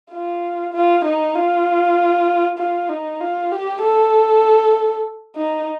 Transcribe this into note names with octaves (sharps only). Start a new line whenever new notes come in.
F4
F4
D#4
F4
F4
D#4
F4
G4
A4
D#4